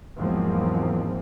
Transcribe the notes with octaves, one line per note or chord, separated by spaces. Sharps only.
E2 G#2 F3 F#3 A#3 C4